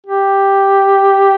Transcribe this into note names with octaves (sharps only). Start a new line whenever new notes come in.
G4